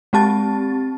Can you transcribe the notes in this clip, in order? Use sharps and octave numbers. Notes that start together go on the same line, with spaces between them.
G#3 C4 G4 A5 A6